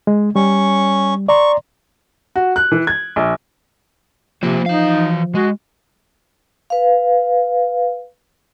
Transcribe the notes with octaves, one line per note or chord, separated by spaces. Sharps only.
G#3
G3 C#4 C#6
D5 A#5 C6 C#6
F#4
F#6
E3
G#6
A#1
C3 F3 A#3 C5
E3 D#4 F5
G#3 F#4
B4 F5